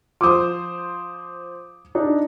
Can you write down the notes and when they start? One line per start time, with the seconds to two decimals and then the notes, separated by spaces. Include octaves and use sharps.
0.21 F3 C5 D6 D#6
1.95 D4 D#4